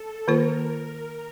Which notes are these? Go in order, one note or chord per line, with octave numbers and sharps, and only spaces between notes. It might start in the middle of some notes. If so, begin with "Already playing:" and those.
Already playing: A4
D#3 A#3 F4 A#4 C5